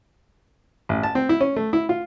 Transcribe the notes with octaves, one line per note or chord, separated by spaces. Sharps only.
A1
A5
C4
E4
C#4
A3
E4
F4